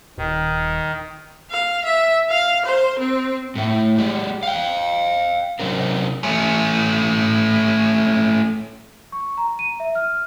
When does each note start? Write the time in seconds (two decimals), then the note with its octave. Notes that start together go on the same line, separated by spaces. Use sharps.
0.17 D#1 D#3
1.50 F5
1.84 E5
2.29 F5
2.65 C5
2.99 C4
3.55 A2 A3
3.98 G#3 G4
4.43 F5 G5
5.59 C3 F#3 C#4 D4 A#4
6.23 A3 C#4
9.12 C#6
9.37 A#5
9.59 D#7
9.80 E5
9.95 F6